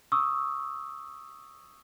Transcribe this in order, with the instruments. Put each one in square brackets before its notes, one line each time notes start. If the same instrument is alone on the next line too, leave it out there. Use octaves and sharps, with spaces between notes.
[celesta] C#6 D#6 E6